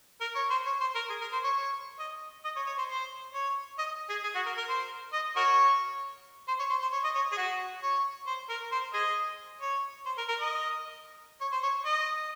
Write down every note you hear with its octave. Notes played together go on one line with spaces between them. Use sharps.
A#4
C#5
C5
C#5
C5
A#4
G#4
A#4
C5
C#5
C#5
D#5
D#5
C#5
C#5
C5
C5
C#5
D#5
G#4
G#4
F#4
A#4
A#4
C5
D#5
F#4 A#4 C#5
C5
C#5
C5
C5
C#5
D#5
C#5
G#4
F#4
C#5
C5
A#4
C5
G#4 C5 D#5
C#5
C5
A#4
A#4
D#5
C#5
C5
C#5
D#5